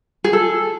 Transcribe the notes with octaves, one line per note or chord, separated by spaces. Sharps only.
G#4
A4